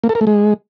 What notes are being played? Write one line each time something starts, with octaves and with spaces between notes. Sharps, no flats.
A#3
A4
A#4
A3
G#3